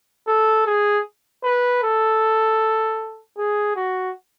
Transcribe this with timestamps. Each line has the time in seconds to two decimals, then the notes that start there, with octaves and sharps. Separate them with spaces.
0.28 A4
0.66 G#4
1.44 B4
1.83 A4
3.38 G#4
3.76 F#4